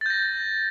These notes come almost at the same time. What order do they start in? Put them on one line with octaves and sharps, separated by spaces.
A6 G6 A#6